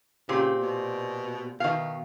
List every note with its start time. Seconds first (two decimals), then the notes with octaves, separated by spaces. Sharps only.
0.29 A#2 C#3 C4 G4
0.63 B2
1.60 B2 D#3 F5